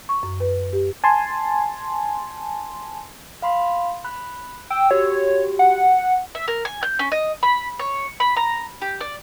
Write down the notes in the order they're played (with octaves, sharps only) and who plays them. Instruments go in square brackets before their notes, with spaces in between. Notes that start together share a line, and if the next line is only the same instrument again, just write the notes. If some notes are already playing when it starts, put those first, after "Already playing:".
[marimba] C#6
F#2
B4
G4
[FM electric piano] G#5 A5 C6
[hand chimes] F5 B5 C6
B5 F#6
[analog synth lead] G5 [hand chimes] E6
[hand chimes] F#4 G4 [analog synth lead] C#5
[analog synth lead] F#5
[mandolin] E5
A#4
G#5
G6
C#4
D#5
B5
C#5
B5
A#5
G4
D5